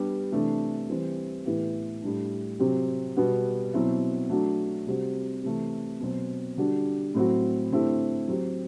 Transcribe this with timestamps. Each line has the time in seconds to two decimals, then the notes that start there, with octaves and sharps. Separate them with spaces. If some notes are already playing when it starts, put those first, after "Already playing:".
Already playing: G3 B3 D4 G4
0.32 C3 E3 A3 D4
0.89 E3 G3 C4
1.45 A2 E3 B3 E4 G4
2.02 A2 G3 D4
2.59 C3 F#3 C4 G4
3.16 B2 G3 B3 F#4
3.73 B2 F#3 C4 E4
4.29 F#3 A3 D4 F#4
4.87 C3 G3 C4 F#4
5.43 C3 E3 A3
6.00 B2 F#3 C4
6.57 D3 G3 D4 F#4
7.14 A2 F#3 C4 F#4
7.71 D3 A3 C4 E4 G4
8.28 F#3 C4 G4